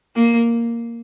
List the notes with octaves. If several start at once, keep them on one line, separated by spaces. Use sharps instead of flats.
A#3